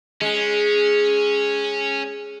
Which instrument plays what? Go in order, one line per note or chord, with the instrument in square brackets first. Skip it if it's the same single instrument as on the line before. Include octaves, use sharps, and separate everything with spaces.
[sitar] G#3 [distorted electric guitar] C#4